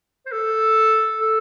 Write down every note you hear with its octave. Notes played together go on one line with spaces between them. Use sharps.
C5
A4
A4